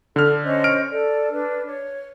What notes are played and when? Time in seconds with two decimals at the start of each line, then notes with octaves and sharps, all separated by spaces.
0.16 D3 A4 F6
0.42 C#4 C5 D#5
0.64 F6 D7
0.90 A4 D5
1.29 D4 B4
1.64 C#5